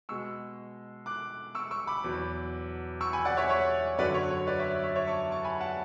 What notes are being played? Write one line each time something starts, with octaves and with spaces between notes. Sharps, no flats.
B2 G#3 C#6 E6
D6 F#6
C#6 E6
C#6 E6
B5 D6
E2 B2 F#3
C#6 E6
G#5 B5
D5 F#5
C#5 E5
C#5 E5
F#2 D3 F#3 B4 D5
C#5
C#5
B4 D5
C#5 E5
C#5 E5
C#5 E5
A5 C#6
A5 C#6
G#5 B5
F#5 A5